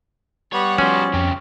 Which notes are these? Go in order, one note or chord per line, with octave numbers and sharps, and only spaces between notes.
G3 B3 C#5
F3 C#4 F#4 C5
F2 C#3 G4